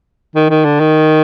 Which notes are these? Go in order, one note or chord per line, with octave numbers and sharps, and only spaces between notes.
D#3
D#3
D3
D#3